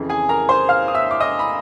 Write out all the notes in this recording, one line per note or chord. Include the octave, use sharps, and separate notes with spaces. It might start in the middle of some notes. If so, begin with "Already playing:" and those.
Already playing: F2 C#3 E3
G#4 G#5
A#4 A#5
C5 C6
F5 F6
D#6
E5 E6
D6
D#5 D#6
B5